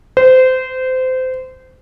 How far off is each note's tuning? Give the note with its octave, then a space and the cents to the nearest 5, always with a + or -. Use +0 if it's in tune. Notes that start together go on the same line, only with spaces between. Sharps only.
C5 -25